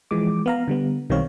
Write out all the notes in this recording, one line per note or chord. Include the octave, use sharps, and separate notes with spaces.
E3 F3 G#3 D6
B3 F5 A#5
D3 G3 B3
B1 D#3 G3 C4 C#5 F5